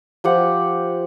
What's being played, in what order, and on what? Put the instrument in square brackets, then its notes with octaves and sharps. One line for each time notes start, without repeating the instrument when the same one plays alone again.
[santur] F3 G4 F#5